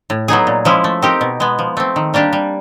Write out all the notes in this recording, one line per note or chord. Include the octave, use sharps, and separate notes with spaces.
A2
F#3 B3 D#4 G#4
A#2
F3 G#3 C#4 E4
A3
C4 D#4 G4 A#4
B2
G#3 B3
F3
A3 C4
D#3
G3 A#3 D4 G4
G3